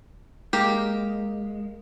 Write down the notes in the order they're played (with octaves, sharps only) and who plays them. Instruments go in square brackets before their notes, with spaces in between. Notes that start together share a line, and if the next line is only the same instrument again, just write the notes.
[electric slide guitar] G#3 [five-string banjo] A#3 G4 A#4